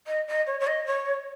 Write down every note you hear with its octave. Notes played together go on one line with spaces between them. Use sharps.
D#5
D#5
C#5
C#5
D#5
C#5